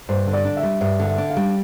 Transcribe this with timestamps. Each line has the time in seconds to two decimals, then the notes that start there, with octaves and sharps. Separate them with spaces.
0.09 G2 C5
0.27 D3
0.33 D5
0.45 D4
0.57 E5
0.63 G3
0.81 G2 E5
1.00 D3
1.05 E5
1.18 D4
1.30 F5
1.37 G3